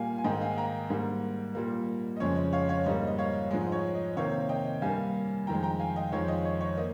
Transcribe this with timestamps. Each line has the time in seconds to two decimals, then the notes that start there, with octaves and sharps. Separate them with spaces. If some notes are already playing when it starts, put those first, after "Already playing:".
Already playing: A#2 G3 A#3 F5 G5 G#5
0.18 G#5
0.24 G#2 D#3 A#3 D#5 G5
0.41 F5 G#5
0.58 G5 A#5
0.90 G#2 G3 A#3
1.55 A#2 G3 A#3
2.16 D#5
2.20 F2 C#3 G#3 C#5
2.36 D#5
2.53 C#5 F5
2.69 C#5 F5
2.86 G#2 G3 A#3 D#5
3.07 D#5
3.18 C#5 F5
3.51 G#2 F3 G#3 D#5
3.72 C#5
3.95 D#5
4.16 C3 D#3 A#3 C#5 F5
4.49 D#5 G5
4.82 G2 G3 A#3 F5 G#5
5.47 F2 D#3 G#3 G5 A#5
5.63 G5 A#5
5.79 F5 G#5
5.96 D#5 G5
6.12 F2 D#3 G#3 C#5 F5
6.28 D#5
6.45 C#5
6.61 C#5
6.77 A#3 D#5